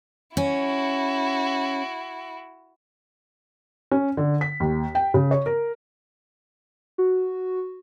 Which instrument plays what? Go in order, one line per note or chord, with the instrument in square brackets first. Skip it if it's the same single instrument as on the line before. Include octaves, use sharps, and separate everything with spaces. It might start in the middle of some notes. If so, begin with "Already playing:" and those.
[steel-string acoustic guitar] C#4 [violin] E4 F#4
[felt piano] C#4
D3
B6
D#2
G5
C#3
C#5
A#4
[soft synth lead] F#4